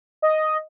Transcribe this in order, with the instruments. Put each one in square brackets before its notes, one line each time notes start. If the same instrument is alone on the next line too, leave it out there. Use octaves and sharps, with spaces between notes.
[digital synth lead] D#5